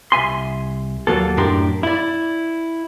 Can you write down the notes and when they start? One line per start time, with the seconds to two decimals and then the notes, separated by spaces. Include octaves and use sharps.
0.12 C2 E5 G#5 C6
1.07 D#2 F#3 A#3 A4
1.37 F#2 A2 D4 G4 A#4 C6
1.83 E4 D5